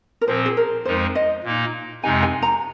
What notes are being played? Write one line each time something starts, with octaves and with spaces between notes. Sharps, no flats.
A#4
A#2 F3 C4 C5
G#4
A#4
F2 F3 G#3 D#4 C5
D#5
A#2 A#3 D#4
F2 C3 G#3 D#4 G#5
G#5
A#5